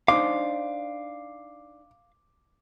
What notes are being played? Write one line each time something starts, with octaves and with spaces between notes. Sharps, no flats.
D4 D#4 C5 F5 D6